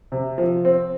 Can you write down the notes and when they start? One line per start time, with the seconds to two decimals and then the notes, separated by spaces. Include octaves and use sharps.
0.12 C3
0.38 F3
0.65 C4